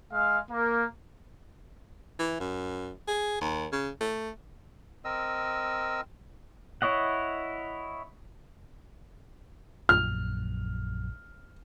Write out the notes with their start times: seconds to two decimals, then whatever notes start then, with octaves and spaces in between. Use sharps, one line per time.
0.11 G#3 F5
0.49 A#3
2.19 E3
2.40 F#2
3.08 G#4
3.41 D#2
3.72 C#3
4.00 A3
5.05 C4 A#4 D#5 E6
6.82 E4 C#5 D#5 F#5
9.89 A#1 F#2 F6